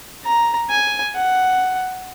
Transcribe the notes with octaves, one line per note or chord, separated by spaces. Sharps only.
A#5
G#5
F#5